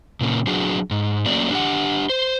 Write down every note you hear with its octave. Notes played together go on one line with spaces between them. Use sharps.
A#2 C#3 A#3
F#3 D4 F#4 G#4
G#2
F#3 A3 A#3 C#4 D5
D4 G4 F#5
C5